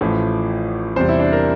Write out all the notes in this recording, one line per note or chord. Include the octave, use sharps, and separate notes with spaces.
A1 A2 F3
E2 C3 G3 C5
E4
D4
A#4